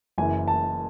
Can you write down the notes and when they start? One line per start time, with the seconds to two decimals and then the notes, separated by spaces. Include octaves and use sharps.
0.18 F#1 F#2 E3 G#5
0.48 A5